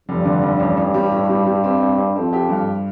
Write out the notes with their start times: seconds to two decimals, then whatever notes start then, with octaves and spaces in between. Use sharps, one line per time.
0.08 F1 G2
0.25 D3
0.43 F1
0.60 A1
0.77 A1
0.94 G3
1.12 A2
1.29 G3
1.46 G3
1.64 C4
1.80 C4
1.98 C4
2.15 F2 C4
2.33 G4
2.49 G2